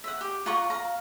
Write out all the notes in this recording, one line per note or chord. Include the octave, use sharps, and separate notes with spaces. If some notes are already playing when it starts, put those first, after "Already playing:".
E5 F#5
G4
F4 F#5 A#5 C#6
F5 A#5